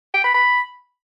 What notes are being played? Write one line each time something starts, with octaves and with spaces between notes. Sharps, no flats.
G5
B5
B5